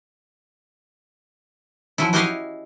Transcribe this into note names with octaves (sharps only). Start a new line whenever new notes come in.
F3 F#3 C#4 E4
E4 F#4 G4 C#5 D#5 F5